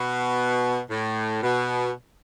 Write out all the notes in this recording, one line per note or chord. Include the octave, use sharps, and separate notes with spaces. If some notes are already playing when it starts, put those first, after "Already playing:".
Already playing: B2
A2
B2